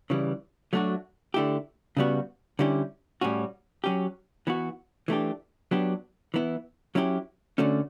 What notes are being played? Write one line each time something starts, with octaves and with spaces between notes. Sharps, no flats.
C#3 E3 G3
F#3 A3 D4 F#4
D3 A3 E4 G4
C#3 G3 B3 F#4
D3 G3 C#4 E4 G4
A2 G3 C#4 F#4
F#3 C#4 G4
E3 B3 F#4
E3 A3 D4 G4
F#3 B3 D4 G4
E3 B3 E4
F#3 C#4 E4 G4
D3 A3 C#4 F#4